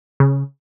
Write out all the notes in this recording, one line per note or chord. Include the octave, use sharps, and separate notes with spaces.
C#3